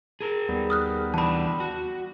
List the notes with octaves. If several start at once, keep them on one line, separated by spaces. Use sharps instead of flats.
G#4 A#4
D#2 G3 B3
D#6 F6 F#6
E3 D4 A5 B5
F#4